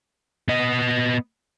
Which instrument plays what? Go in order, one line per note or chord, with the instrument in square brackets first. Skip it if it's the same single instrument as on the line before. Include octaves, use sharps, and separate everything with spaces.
[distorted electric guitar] B3 D#5